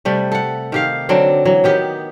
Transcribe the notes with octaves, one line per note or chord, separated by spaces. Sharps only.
C3 G3 A3
A4 F#5
D#3 G4 F5
D3 F#3 C4 D4
E3 F#3
D#3 B3 G4